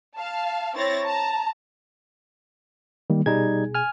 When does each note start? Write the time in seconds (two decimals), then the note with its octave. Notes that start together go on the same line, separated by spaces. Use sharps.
0.16 F5 A5
0.75 C4 E4 C#5 A6 A#6
1.06 A5 A#5
3.10 D#3 G3 A#3
3.26 B2 G3 D#4 G#4 G#6
3.75 G#5 F6